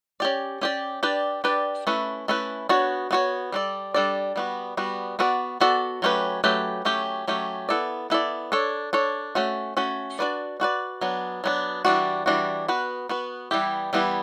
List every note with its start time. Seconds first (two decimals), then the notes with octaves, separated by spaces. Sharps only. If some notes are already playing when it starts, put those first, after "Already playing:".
0.20 C#4 G4 D5
0.61 C#4 G4 D5
1.03 D4 G4 B4 D5
1.44 D4 G4 B4 D5
1.87 A3 C#4 E4 B4
2.28 A3 C#4 E4 B4
2.69 B3 D4 F#4 C#5
3.11 B3 D4 F#4 C#5
3.52 G3 D4 A4 D5
3.94 G3 D4 A4 D5
4.36 G3 B3 F#4
4.77 G3 B3 F#4
5.19 B3 F#4 A4 D5
5.61 B3 F#4 A4 D5
6.02 F#3 A3 C#4 G4 B4
6.44 F#3 A3 C#4 G4 B4
6.85 F#3 A3 C#4 G4
7.28 F#3 A3 C#4 G4
7.69 B3 E4 A4 D5
8.10 B3 E4 A4 D5
8.52 D4 A4 C#5
8.93 D4 A4 C#5
9.35 A3 C#4 F#4
9.77 A3 C#4 F#4
10.19 D4 F#4 B4 D5
10.60 D4 F#4 B4 D5
11.01 F#3 B3 D4
11.44 F#3 B3 D4
11.85 E3 G3 D4 F#4
12.26 E3 G3 D4 F#4
12.68 B3 F#4 B4
13.09 B3 F#4 B4
13.51 E3 G3 B3 E4 G4
13.93 E3 G3 B3 E4 G4